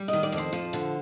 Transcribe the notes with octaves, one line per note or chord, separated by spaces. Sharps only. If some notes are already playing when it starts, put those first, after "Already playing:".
Already playing: G3
D#3 D#5
D5
F2
C5
F3
D3